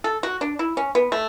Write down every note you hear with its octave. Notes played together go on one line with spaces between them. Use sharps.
A4
F#4
D4
E4
C#4
B3
A3